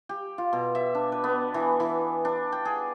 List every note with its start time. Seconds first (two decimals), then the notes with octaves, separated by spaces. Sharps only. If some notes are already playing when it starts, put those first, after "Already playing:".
0.09 G4
0.38 F4
0.53 B2
0.75 E5
0.95 D4
1.12 B4
1.24 B3
1.54 E3
1.80 E3
2.25 D4
2.52 G5
2.65 G#4